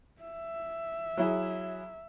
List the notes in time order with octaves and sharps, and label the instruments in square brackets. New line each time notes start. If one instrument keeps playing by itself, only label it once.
[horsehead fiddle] E5
[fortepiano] F#3 E4 G#4